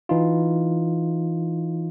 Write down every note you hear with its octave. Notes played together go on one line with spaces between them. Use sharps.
E3 D#4 F4